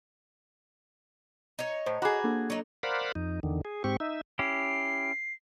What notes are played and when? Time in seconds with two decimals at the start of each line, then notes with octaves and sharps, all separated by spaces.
1.59 D#4 C#5
1.86 A2 C5
2.02 F#4 G#4 A#5 B5 D6
2.24 A#3 D4 A4
2.50 F#3 D#4
2.83 A#4 C5 D5 F5 F#5 B5
3.15 F2 D#4
3.43 E2 D3 D#3
3.65 G#4
3.84 G#2 C4 G4 C#6
4.00 D#4 E5
4.39 C#4 E4 G4 C7